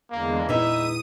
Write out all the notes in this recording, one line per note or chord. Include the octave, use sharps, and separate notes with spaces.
E2 D3 G#3 A#3
A#2 B3 D#4 E4 G4 E5 D#6 D#7